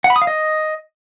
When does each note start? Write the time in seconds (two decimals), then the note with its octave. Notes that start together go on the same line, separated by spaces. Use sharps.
0.04 F#5
0.10 B5
0.16 D#6
0.22 F5
0.27 D#5